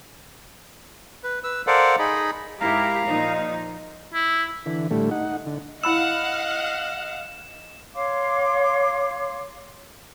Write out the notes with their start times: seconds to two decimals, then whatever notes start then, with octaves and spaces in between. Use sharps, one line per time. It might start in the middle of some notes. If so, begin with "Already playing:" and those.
1.24 B4
1.44 B4 E6
1.67 A4 A#4 C5 D5 F5 F#5
1.99 D#4 G#4 D#5 B5
2.60 G#2 E4 G4 A#4 F5 A#5
3.07 A#2 F3 D#4
4.14 E4
4.66 D3 E3
4.91 A2 D3 G3 A3
5.11 D#4 F#5
5.46 D3
5.84 E4 D#5 F5 F#5 B5 E6 E7
7.96 C#5 F5 C6 D6